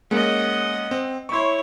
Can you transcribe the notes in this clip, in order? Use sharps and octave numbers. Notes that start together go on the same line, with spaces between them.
G#3 A#3 C#4 D#5 F#5
C4
E4 C#5 C6 C#6